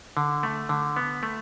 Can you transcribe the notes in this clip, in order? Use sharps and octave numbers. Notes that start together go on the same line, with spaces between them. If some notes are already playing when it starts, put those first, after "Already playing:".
D3
A3
D3
B3
A3